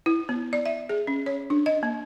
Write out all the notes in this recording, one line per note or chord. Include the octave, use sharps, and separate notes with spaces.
E4
B3
D5
E5
G#4
C#4
C#5
D4
D#5
A#3